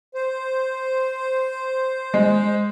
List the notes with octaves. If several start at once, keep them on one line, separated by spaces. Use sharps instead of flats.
C5
G#3